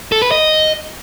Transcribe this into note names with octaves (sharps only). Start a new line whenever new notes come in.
A4
B4
D#5